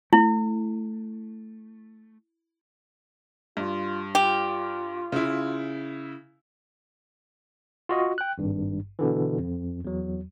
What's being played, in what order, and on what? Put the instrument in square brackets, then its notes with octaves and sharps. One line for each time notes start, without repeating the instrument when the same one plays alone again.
[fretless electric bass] A3 [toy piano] E4
[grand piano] G2 [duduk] F4
[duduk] F4 [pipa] G4
[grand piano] C#3 E4
[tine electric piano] F4 F#4 D#5
G5 F#6
G#1 G2
B2 D3 E3
F2
E2 F#3